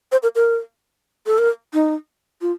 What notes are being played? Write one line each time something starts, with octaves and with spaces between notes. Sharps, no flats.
C5
A#4
A#4
A4
A#4
D#4
F4